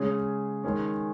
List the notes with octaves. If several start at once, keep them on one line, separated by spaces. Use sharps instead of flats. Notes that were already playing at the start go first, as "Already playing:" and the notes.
Already playing: C#3 G#3 C#4 G#4
D#3 G#3 C#4